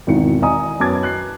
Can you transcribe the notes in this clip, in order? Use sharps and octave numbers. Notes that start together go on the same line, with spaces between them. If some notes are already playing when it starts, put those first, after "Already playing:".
G#1 E2 B2 D#3 C#7
D5 D#5 G#5 A#5 D#6
F#2 B3 A5 D6 G#6 A6
F#6 C7